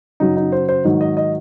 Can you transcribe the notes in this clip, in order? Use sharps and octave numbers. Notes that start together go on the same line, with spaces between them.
F#2 C#3 F#3 D#4
D#4
C5
C5
G#2 D#3 F#3
D#5
D#5